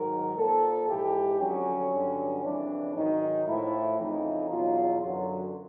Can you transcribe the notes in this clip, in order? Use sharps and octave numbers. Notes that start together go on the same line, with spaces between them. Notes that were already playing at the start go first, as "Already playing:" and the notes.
Already playing: G#2 D#3 F#3 A#4
A#2 F3 A4
G#2 E3 G4
F2 D3 F#3 C#4
G2 D3 F#3
F2 C#3 E3 D4
G#2 D#3 F#3 D#4
A2 F3 E4
F2 C#3 E3 D#4
E2 B2 F#3 F4
F#2 D3 F#3